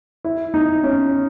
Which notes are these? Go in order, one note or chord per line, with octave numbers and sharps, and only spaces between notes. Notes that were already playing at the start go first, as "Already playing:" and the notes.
E4
D#4
C#4